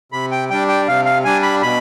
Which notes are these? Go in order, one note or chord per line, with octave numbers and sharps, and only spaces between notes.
C3 B5
G5
G3 D4 G5
G5
C3 F5
F5
G3 D4 G#5
B5
B2 B5